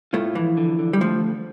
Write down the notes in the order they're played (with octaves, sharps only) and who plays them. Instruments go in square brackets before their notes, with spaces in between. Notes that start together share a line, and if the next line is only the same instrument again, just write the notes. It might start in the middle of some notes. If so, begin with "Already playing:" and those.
[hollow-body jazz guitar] A2 A3 [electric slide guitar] F4
[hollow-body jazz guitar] E3 [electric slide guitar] F3
[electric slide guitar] D3
D3
[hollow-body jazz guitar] G3
[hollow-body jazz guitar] F3 [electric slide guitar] A3